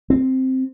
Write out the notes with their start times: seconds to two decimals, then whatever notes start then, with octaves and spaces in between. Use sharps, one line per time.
0.10 C4